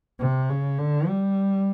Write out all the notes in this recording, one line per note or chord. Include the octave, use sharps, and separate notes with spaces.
C3
C#3
D3
G3